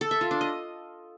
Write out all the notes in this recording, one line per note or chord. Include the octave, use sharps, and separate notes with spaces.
A4
E5
F4
D4
D#5